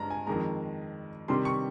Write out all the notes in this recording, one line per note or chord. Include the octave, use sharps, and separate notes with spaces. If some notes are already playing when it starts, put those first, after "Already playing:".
Already playing: G2 G#3 A#5
G#5
F2 D#3 G#3 A#5
C3 D#3 G3 C6
C#6